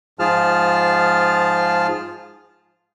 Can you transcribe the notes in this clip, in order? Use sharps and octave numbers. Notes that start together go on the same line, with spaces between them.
G#2 F3 F4 G#4 A5 F6